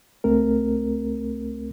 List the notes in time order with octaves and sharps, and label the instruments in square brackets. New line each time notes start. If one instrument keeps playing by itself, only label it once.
[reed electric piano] C#2 A3 C4 A#4